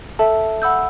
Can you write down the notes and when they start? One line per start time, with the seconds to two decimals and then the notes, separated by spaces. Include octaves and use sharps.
0.19 A4 E5 A5
0.62 F#5 B5 E6 G6